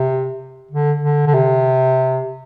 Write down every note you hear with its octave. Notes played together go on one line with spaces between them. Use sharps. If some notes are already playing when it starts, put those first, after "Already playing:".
Already playing: C3
D3
D3
D3
C3